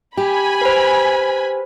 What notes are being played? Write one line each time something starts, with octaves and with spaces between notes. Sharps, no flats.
G4 G#5 B5
B4 C5